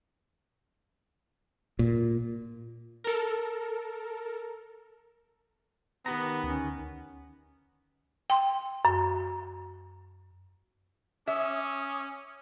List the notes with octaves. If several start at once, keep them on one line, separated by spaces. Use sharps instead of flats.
A#2
A4 A#4
D#3 B3 G4 A#5
D2 C#4
G5 C6
F#2
C#4 E5 D6 D#6